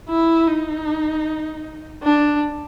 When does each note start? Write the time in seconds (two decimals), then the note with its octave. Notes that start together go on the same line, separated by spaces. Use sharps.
0.09 E4
0.47 D#4
2.03 D4